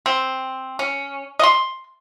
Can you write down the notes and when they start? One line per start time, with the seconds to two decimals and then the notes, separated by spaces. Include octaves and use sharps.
0.06 C4
0.79 C#4
1.39 D#5 C6